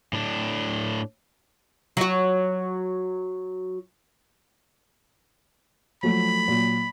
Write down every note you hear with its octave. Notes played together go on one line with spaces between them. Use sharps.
A2 D4
F#3 F#4
F3 F#3 A3 B5
A#2 F#3